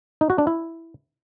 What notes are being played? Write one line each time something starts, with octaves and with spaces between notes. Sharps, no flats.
D#4
F#4
D4
E4